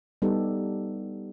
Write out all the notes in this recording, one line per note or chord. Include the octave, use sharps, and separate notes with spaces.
G3 B3 D#4 G4 A4